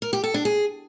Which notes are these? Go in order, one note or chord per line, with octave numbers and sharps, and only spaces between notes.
A#4
G4
A4
D4
G#4